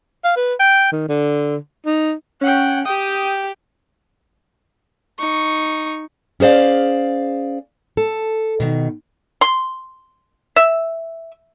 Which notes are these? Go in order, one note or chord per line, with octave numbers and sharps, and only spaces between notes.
F5
B4
G5
D#3
D3
D#4
C#4 F#5 G5
G4 G5 D#6
D#4 C#6
C#4 G#4 C5 D5 F5
A4
B2 D#3
C6
E5